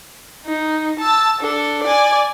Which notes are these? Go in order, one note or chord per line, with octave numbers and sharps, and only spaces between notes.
D#4
A5 E6
D4 A4
D5 G#5